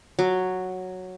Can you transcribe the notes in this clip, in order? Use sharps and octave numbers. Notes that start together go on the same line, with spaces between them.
F#3